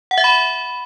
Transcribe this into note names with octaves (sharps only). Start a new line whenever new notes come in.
F#5
E5
B5